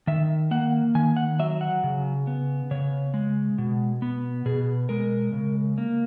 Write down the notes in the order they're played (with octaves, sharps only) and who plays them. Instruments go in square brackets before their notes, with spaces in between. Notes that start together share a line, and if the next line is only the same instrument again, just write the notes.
[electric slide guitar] D#3 E5
A#3 F#5
D#3 G#5
F#5
F#3 E5
F#5
C#3
B3
C#3 C#5
G#3
B2
B3
B2 G#4
G#3 A#4
C#3
A#3